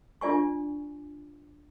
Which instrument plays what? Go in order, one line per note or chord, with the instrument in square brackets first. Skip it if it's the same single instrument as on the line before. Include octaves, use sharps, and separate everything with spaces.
[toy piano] D4 F4 D5 G#5 C#6